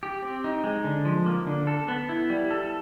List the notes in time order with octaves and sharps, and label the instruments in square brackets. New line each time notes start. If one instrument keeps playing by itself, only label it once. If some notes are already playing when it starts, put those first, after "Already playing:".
[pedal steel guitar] G4
C4
D#4
G#3
D3
F3
A#3
D3
A4
B3
E4
G3
A4